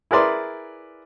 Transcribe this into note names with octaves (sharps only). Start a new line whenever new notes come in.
E4 G#4 A#4 B4 D5 C6